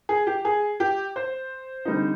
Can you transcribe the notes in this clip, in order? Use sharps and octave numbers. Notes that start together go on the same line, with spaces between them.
G#4
G4
G#4
G4
C5
D3 G3 C4 D#4